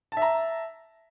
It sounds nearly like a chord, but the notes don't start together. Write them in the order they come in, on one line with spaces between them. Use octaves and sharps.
A5 E5 A#5